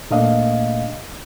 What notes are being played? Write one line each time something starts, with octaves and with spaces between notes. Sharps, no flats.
A#2 A3 A#3 D4 D#5 F5